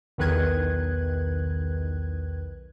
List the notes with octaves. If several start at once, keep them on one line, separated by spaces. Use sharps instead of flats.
B1 E2 D#3 B4 F#6 G#6